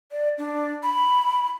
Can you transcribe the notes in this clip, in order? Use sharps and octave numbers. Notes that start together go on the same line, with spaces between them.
D5
D4
B5